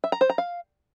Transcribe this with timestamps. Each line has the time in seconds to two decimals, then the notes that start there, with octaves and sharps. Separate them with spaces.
0.04 E5
0.12 A#5
0.21 C5
0.30 A#5
0.38 F5